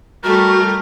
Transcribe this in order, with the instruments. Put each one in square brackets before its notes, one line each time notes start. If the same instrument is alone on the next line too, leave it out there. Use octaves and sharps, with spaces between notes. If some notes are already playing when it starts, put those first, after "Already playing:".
[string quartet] G3 A3 [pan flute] F#4 [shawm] A#4